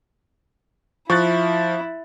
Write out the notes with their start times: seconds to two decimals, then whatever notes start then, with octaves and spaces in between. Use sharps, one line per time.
1.10 F3 E4 C#6 F#6 A6